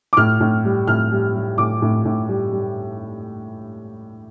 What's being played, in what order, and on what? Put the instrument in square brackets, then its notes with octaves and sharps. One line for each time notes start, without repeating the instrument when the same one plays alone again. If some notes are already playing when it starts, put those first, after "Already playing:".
[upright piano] D6
A2 F6
A2
G3
A2 F6
G3
G3
A2 D6
A2
A2
G3
G3